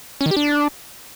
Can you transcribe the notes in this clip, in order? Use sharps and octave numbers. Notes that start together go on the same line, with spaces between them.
C#4
D#3
G4
D4